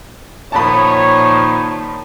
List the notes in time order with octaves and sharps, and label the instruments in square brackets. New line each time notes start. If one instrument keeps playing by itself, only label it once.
[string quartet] A#2 D#3 F3 [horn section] C#5 [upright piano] A5 B5